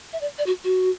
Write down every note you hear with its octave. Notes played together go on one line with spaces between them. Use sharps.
E5
D5
D5
F#4
F#4